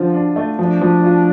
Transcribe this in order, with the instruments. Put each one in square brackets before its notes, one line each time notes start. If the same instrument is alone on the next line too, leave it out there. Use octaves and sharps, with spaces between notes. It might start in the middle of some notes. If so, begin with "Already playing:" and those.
Already playing: [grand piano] D3 F4 [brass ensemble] F3
[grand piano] D4
A3
[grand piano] F3 [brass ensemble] D4
[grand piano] F3
F4